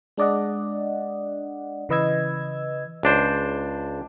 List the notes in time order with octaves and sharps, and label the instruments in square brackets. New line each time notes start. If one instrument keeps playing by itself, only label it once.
[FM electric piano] G#3 D4 D5 D#5 F#5
C#3 E3 B4 D#5 E6 G#6
[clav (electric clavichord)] C#2 D4 C5